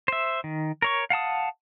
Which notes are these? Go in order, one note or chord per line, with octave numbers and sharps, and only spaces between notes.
C5 E5
D#3
A#4 C#5 C#6
F5 F#5 A5 D#6